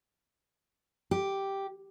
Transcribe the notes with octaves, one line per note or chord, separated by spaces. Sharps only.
G4